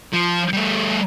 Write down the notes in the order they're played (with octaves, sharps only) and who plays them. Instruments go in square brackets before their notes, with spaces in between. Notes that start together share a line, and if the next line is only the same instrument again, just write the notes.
[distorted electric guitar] F3
G3 A3